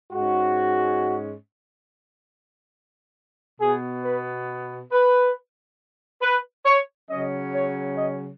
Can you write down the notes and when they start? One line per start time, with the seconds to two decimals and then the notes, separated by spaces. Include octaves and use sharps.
0.12 G#2 G#3 C#4 F#4
3.60 B2 B3 G#4
4.04 B4
4.92 B4
6.22 B4
6.66 C#5
7.09 C#3 F#3 C#4 D#5
7.53 C#5
7.96 D#5